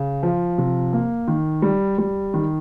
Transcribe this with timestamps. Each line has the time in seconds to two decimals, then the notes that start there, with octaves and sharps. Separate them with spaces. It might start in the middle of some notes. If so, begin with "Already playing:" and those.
Already playing: C#3
0.23 F3
0.58 C3
0.93 A#3
1.28 D#3
1.62 G3
1.98 G3
2.34 D#3